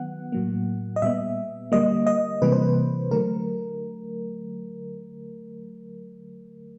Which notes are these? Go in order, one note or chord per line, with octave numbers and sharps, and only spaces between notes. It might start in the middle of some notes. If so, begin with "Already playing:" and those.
Already playing: D#3 F#3 B3 F#5
A2 F#3 A#3
D#5
A#2 G3 B3 E5
D3 G3 A#3 D#5
D#5
C3 E3 G3 A#3 B4
C5
B4
D3 F#3 A3 A#4